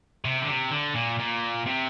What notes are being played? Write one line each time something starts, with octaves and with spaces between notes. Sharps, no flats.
C3
D3
C3
D3
A#2
A#2
C3